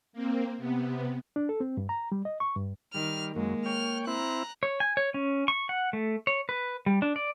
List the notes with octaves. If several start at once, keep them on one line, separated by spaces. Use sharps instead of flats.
A#3 C4
C3 B3
D4
A4
C4
G2
A#5
G3
D#5
C#6
G2
D#3 G3 F6
F#2 G#3 A#3
C#5 G5 F6
C4 E4 A#5 F#6
C#5
G#5
C#5
C#4
C#6
F#5
A3
C#5
B4
G3
D4
D5